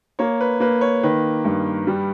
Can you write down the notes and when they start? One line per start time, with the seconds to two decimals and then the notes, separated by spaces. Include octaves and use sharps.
0.19 A#3 C#5
0.41 B4
0.60 A#3 B4
0.81 C#5
1.03 D#3 B4
1.45 G2
1.87 G3